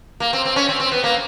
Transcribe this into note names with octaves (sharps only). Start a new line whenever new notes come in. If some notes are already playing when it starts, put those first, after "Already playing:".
A#3
C4
C4
C#4
C4
C4
B3
A#3